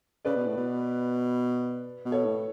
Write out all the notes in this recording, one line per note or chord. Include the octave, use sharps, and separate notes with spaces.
C#3 B4 D5
B2
A2
B2
B2
A4 C#5
A2